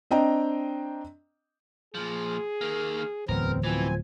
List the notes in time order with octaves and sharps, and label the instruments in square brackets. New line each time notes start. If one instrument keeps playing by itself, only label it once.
[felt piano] C4 D4 D#5 G5 A#5
[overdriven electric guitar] A#2 F3 [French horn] G#4
[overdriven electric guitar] D#3 A#3
[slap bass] D1 F#3 [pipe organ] E2 C4 [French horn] B3 [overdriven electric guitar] A#4
[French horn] B2 [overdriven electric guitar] E3 [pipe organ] F3 C4 G#5